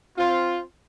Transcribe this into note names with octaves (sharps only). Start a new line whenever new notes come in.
C4 F4